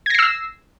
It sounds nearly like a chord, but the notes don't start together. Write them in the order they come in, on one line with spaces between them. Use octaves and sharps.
G#6 A#6 C7 E6